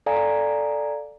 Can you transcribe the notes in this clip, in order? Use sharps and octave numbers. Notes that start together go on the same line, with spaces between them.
A4 D5 F5 G#5 A#5